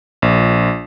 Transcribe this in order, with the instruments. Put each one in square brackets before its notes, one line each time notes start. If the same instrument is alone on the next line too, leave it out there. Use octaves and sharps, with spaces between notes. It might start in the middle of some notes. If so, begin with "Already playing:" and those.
[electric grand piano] A#1